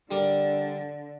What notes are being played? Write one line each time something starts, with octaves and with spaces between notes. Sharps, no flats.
D3 G3 D4 A#4 D5